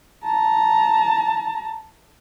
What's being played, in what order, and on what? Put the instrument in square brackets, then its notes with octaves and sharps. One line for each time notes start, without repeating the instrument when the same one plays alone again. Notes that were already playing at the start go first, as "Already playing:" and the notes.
[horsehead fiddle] A5 A#5